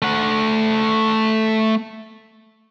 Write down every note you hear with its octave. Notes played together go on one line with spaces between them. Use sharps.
A3 F#5